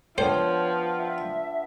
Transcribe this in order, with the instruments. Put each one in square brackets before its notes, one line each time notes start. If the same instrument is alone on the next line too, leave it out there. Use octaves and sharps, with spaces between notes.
[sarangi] F3 [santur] B3 D4 G5 [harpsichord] C5 [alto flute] C#5
[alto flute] E5